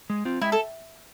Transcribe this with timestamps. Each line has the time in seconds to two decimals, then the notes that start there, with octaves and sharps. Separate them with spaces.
0.10 G#3
0.25 C4 F4
0.41 G#3 E4
0.52 A4